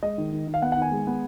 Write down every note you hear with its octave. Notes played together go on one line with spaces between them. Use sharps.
G#3 D#5
D#3
D#3
D#3
F5
B3 F#5
F#5
D#3
G#5
G#3
B3